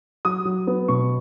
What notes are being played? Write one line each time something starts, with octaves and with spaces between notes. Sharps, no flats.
F#3 D#6
F#3
B3
B2 C#6